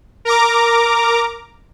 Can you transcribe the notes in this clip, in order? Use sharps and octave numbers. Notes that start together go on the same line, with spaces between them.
A#4 A#5 D6